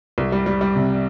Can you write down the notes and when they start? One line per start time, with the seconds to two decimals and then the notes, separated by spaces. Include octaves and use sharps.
0.18 C2
0.32 G3
0.46 G3
0.61 G3
0.76 C3